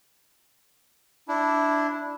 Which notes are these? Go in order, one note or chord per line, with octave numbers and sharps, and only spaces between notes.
D4 E4